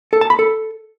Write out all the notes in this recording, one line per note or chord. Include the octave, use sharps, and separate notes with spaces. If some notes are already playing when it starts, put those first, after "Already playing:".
A4
A5
B5
A4